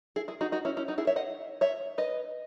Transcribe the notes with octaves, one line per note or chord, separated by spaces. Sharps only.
E4 G#4
E4 G#4
D#4 F#4
D#4 F#4
C#4 E4
C#4 E4
D#4 F#4
E4 G#4
C#5 E5
D#5 F#5
C#5 E5
B4 D#5